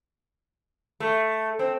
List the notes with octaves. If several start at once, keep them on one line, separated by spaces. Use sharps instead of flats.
A3
C4